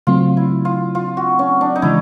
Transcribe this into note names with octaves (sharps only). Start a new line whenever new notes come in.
C#3 F#3 A3 C4 F4
E4
F4
F4
F#4
C#4
D4
D#4
C#3 E3 G#3 E4